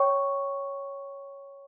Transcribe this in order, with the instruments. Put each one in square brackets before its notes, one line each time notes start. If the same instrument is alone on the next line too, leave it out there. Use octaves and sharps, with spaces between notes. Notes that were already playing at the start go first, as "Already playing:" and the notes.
Already playing: [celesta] C#5 G5 C#6